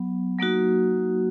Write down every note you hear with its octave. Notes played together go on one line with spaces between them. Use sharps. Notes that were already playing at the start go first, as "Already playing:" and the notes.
Already playing: F#3 B3
F#3 A#3 D#4 F#4